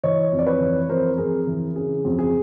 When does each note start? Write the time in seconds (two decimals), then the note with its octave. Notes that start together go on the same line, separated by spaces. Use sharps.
0.04 E3 C#5 D#5
0.32 F2
0.39 D5
0.47 B4 C#5
0.61 E3
0.89 F2 A#4 C5
1.18 F2 G#4 A#4
1.47 E3
1.76 C#3 G#4
2.05 F2
2.19 G#4